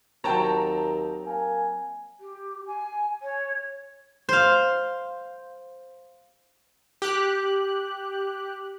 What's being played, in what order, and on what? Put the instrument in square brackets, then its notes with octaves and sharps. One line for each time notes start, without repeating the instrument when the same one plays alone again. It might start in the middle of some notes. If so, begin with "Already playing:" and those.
[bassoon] D#2 [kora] F#3 C4 C#5 [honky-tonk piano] G5 A5 A#5
[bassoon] A#3 [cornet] G#5
[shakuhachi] G4
G#5
C#5
[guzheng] C5 F5
[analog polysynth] G4 F#6